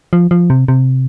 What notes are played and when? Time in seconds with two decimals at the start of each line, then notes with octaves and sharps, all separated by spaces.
0.13 F3
0.31 F3
0.50 C3
0.68 C3